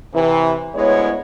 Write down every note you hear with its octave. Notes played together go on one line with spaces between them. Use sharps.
C3 E3
D2 G#3 B3 E4 C#5